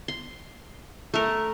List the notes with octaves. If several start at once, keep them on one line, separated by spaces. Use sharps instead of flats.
C6
A3 A#4